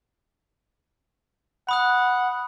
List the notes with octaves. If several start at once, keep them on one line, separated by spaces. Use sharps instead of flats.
F#5 B5 D#6 F#6